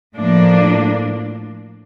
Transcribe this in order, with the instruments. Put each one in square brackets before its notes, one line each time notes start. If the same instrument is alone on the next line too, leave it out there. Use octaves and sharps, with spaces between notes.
[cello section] A2 F3 A#3 D4